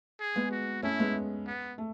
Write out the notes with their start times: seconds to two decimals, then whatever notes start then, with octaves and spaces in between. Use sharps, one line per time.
0.20 G#4
0.36 G#3 B3
0.52 F#4
0.83 A3 C#4 E4
1.00 G#3 B3
1.47 B3
1.78 A3